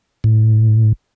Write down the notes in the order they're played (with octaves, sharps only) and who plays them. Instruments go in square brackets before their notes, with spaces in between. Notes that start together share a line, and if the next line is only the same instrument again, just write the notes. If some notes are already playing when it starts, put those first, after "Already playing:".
[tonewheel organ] A2